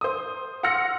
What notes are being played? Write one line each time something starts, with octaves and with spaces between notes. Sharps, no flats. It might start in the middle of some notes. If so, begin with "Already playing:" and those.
C5 D#6
F#5 C6 E6 F6 A#6 C#7